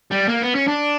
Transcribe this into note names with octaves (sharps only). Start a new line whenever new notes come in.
G3
A#3
B3
C#4
D4